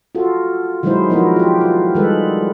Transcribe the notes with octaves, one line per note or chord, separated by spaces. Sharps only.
F4 F#4 A4
D#3 F#3 G#3 D#4 E4 C5
F3 B3 E4 F#4 A#4
F4 G4
F4
D#3 G3 G#3 A4 B4